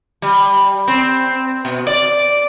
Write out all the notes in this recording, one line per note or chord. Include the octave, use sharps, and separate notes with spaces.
G3
C4
B2
D5